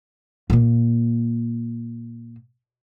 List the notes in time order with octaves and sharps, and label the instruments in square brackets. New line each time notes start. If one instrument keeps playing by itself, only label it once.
[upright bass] A#2 A#3